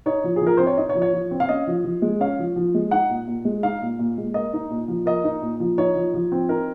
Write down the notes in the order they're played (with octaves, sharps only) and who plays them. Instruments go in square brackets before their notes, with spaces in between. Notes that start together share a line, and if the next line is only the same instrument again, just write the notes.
[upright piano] D#4 C#5
F3
G#4
F3
A#4
C4 C5
C#5
D#4 D#5
C#5
F3
C#5
F3
C4
F5
C#4 D#5
F3
F3
G#3
C#4 F5
F3
F3
G#3
D#4 F#5
A#2
A#2
G#3
D#4 F5
A#2
A#2
G#3
A#3 D#5
D#4
A#2
F3
A#3 D#5
D#4
A#2
F3
D#4 C#5
F3
F3
C4
D#4 A#4